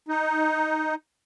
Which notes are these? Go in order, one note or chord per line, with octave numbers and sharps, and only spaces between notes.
D#4